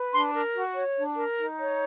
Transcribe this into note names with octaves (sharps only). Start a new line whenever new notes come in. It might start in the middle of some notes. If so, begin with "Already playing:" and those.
Already playing: B4
D4 C6
A#4
F#4
C#5
D4
A#4
D#4
C#5